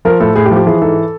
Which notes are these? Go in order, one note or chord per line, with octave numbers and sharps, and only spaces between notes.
F3 A#4
A2 A4
A2 G#4
G4
F3
G4
E3 G#4
G#2 A4